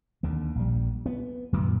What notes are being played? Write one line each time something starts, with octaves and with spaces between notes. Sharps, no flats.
D#2 D3
A#1 G3
B3
F#2 A#2 D3 D#3